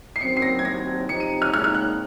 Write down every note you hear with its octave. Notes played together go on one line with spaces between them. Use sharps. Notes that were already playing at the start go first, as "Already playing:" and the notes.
C7
F#2 D#3 F#3 C4 C#7
C7
A#6
G#6
D#2 D#3 F#3 C4 A#6
C3 F3 C4 D#4 C#7
D#7
F6
A#2 G#3 D#4 F6
F6
F#6